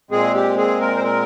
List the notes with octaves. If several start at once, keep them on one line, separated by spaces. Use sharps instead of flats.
A#2 G#3 C4 G#4
G4
G#4
A#4
C5
A#4